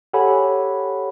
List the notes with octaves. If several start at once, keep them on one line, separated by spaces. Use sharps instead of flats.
G4 A4 C#5 F#5 G#5 B5